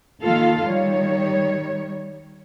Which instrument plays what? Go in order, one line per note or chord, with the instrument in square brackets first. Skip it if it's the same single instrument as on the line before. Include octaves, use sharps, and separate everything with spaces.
[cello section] D#3 A#3 F4 A4 F5
D#3 G3 C#5